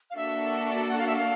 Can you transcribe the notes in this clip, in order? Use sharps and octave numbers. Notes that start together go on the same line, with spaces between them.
F5
A#3 D4 F#4 A4 E5
F#5
F5
E5
F5